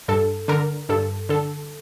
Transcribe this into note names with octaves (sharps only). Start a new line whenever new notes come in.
G2 A4
D3 A#4
G2 A4
D3 A4